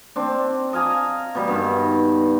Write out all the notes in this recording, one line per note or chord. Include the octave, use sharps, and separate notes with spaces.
C4 D4
D#5 F5 G#5 A#5
B2 G3
G2 D#3